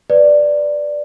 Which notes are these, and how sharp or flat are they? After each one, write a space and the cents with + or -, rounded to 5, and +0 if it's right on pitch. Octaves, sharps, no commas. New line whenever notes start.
B4 +0 D5 +0